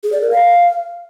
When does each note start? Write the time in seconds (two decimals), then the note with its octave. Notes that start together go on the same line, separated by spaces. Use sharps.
0.03 G#4
0.12 D5
0.21 A#4
0.30 F5